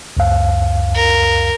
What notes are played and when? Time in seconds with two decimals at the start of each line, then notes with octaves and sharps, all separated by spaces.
0.17 C#2 F#2 F5
0.94 A#4